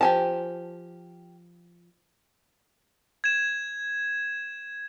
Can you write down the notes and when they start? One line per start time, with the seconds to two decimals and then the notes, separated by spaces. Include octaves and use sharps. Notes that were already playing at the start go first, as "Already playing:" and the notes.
0.01 F3 G4 G#5 A5
3.24 G#6 E7